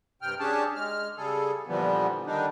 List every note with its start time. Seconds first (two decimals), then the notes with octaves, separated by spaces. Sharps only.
0.22 G2 C3 G5 F6
0.40 C#4 D4 G4 G#4 C#5 A5
0.76 G#3 F6
1.17 C#3 G3 G#4 A4
1.67 A#2 D3 E3 F3 G3 B3
2.26 D3 D#3 G3 D4 D#4